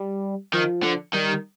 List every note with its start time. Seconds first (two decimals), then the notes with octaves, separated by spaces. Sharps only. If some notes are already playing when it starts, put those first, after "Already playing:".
Already playing: G3
0.53 D#3 F3
0.83 D3
1.14 D#3 G3